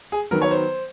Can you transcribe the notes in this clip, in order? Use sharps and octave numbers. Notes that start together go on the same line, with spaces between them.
G#4
D#3 F#3 B3 A#4
C#5
C5